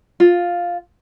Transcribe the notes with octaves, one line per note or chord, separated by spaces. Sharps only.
F4